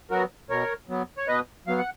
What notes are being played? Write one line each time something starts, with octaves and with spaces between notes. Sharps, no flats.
F#3 B3 F#4 A#4
B2 A#4 C#5
F#3 B3
C#5
B2 B4 D#5
F#3 B3 F5
F#5